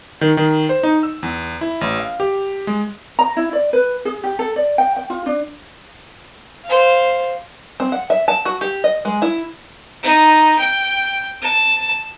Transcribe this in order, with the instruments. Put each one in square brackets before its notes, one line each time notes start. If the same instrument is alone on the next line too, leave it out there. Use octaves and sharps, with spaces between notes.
[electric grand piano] D#3
D#3
C5
D#4
E6
E2
E4
A1
F5
G4
G#3
[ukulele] A#5
E4
D5
B4
G#4
G4
A4
D5
G5
G5
F4
D4
[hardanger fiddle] C5 F5
[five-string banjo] C4
F#5
E5
A5
F#4
G4
D#5
G#3
E4
[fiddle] D#4
G5
A5